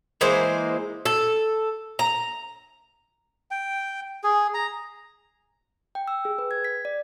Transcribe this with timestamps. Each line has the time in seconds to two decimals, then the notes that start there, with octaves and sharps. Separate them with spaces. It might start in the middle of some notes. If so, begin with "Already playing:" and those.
0.21 E3 G#3 A#3 C5
1.06 A4
1.99 A#5
3.51 G5
4.24 G#4
4.54 A#5
5.95 G5
6.08 E6
6.25 G#4
6.38 B4
6.51 G#6
6.65 B6
6.85 D5